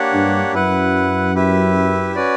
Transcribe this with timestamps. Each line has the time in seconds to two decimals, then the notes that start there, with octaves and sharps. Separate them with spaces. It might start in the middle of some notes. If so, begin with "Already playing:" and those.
Already playing: A#3 D4 G4 C#5 F#5
0.13 G2
0.53 F#2 E4 B4 F#5
1.35 E4 G4 B4 E5
2.15 C#4 F#4 B4 D5